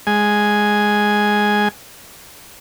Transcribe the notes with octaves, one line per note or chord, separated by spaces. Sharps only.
G#3 G#5